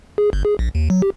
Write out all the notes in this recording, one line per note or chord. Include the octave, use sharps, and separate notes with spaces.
G#4
G1
G#4
A#1
D#2
F#3
G4